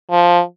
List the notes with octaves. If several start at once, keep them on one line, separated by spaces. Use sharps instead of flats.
F3